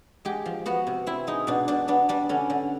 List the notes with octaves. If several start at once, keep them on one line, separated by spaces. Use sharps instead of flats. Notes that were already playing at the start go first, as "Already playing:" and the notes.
G#3 G4
F3
B3 F#4
C3
C4 E4
G#3 D#4
B2 D4
B2 D4
B3 D4
G3 D4
D3 C#4
D3